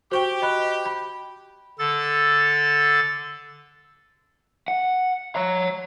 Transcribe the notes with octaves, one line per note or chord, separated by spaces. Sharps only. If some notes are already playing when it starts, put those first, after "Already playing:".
F#4 G4 C5 G5 C#6 G7
D#5 B5 F#6
B5
D3 A4 A6
F#5
C#5 A#5